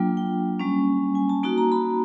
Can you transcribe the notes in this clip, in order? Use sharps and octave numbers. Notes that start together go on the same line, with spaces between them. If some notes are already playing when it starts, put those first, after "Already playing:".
Already playing: F#3 A#3 D4 F4 G5
G5
G3 A#3 C#4 G#5
G#5
A5
A#3 D#4 F#4 A5
A#5
B5